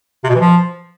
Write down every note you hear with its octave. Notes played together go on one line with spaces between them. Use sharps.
C3
B2
E3
F3